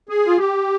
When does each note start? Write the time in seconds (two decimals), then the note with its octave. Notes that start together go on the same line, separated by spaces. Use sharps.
0.09 G#4
0.26 F4
0.38 G4